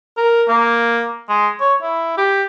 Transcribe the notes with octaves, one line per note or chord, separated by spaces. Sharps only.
A#4
A#3
G#3
C#5
E4
G4